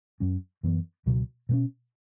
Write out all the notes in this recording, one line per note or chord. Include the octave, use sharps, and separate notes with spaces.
F#2 F#3 C#4
F#2 E3 B3
C#2 B2 F#3
B2 A3 C#4